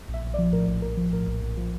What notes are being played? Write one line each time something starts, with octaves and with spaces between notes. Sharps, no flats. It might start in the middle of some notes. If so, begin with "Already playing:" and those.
A#1
E5
A#1
D5
F3
A2 A#4
A#1
A#1 A#4
F3
A2 A#4
A#1
A#1
F3